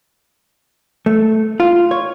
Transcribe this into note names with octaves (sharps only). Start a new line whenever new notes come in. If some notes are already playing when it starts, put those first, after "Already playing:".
A3
F4
C#5